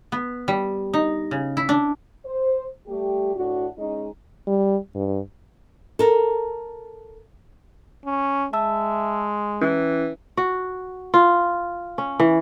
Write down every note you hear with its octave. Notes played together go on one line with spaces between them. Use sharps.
B3
G3
D#4
C#3
E4
D4
C5
G3 A3 G4
A2 D4 F#4
G#3 C#4 D#4
G3
G2
A4 A#4
C#4
G#3 E5 A5 E6
E3 C#4 E4
F#4
F4
C#4
E3